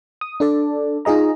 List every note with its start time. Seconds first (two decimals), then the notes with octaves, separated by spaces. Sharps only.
0.21 D#6
0.40 D4 A4 D5
1.05 D#4 F4 G#4 D#5 A#5